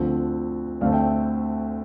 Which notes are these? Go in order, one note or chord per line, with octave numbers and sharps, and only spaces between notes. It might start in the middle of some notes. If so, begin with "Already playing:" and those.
Already playing: D2 D3 F3 C4
D2 D3 A3 C4 D5 F5
E5 G5